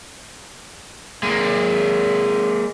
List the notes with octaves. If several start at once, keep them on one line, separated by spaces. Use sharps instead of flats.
G#3 A#3